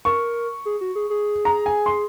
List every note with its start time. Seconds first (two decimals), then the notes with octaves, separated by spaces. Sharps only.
0.05 A#4 C#6
0.66 G#4
0.81 F#4
0.95 G#4
1.10 G#4
1.45 A#5
1.66 G#5
1.86 C6